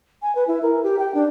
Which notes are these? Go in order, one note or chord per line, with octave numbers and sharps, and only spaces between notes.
G#5
B4
E4
A#4
G4
G5
D4